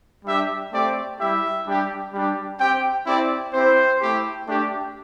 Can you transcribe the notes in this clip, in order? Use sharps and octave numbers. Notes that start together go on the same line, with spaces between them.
G3 D4 G4 E5
A3 C4 G4 D5
G3 E4 G4 E5
G3 D4 G4
G3 D4 G4
C4 G4 G5
C4 E4 G4 D5
C4 E4 G4 C5
A3 E4 G4
A3 D4 G4